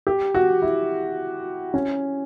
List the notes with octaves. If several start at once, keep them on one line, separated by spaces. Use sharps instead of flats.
G4
F#4
E4
C#4